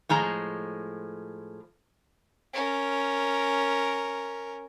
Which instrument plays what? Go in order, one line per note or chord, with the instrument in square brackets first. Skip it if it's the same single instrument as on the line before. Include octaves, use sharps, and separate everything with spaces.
[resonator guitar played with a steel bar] A2 F3 G#3 A#5
[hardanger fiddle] C#4 A#4